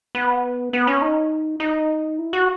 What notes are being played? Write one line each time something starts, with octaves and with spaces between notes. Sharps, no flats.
B3
B3
C#4
D#4
D#4
E4
F#4